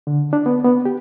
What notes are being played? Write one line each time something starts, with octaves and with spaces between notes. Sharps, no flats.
D3
D4
B3
B3
G4